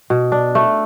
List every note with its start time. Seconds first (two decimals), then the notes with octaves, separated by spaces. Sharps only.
0.10 B2
0.32 D4
0.55 A3